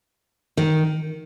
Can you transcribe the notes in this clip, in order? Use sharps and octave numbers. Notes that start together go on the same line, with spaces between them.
D#3